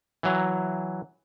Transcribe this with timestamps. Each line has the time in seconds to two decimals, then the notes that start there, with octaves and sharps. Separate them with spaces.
0.23 E3 F#3 A#5